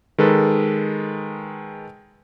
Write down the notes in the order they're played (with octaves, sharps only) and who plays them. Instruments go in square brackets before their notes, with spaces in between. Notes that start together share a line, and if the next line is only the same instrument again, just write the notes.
[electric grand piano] D#3 G#3 A4 B4